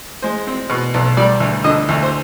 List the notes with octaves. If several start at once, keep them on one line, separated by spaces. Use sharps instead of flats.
G#3 C5
C4
B2
B1
G3 D5
D2
D3 D#5
D2
C5